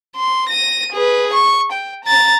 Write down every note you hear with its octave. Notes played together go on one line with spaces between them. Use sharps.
C6
A#6 D#7
G#4 B4
C#6
G5
A#5 A6